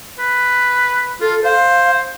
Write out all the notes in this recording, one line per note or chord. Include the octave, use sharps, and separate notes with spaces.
B4
F4 A4
C5 F5